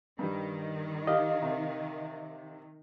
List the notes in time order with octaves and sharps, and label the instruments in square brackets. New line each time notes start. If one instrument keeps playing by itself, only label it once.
[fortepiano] G2 G3 [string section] D#3
[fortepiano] G4 [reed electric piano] D#5 F5
[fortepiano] C3